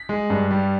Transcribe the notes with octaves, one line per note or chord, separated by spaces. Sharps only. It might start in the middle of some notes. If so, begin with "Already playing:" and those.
Already playing: B6
G#3
G2
G3